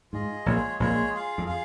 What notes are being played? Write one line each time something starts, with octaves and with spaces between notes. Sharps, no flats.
G#2 F4 G#4 D#5
A#1 A#2 G#3 F4 G#4 C#5
A#1 A#2 G#3 F4 G#4 C#5
F4 G#4 F5
F2
F4 G#4 F5